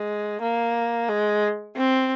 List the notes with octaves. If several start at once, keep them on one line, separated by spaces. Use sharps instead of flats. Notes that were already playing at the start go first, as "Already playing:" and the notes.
Already playing: G#3
A#3
G#3
C4